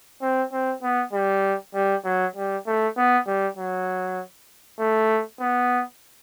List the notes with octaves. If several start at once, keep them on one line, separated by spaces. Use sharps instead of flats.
C4
C4
B3
G3
G3
F#3
G3
A3
B3
G3
F#3
A3
B3